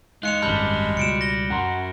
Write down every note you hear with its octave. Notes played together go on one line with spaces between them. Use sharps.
G#3 D#4 F5 F#6 C#7 F7
G#1 F#2 G3 A5 B5 F6 G6
C#2 B2 C#7 D7 E7
A#6 G7
F#2 F#5 A#5 C6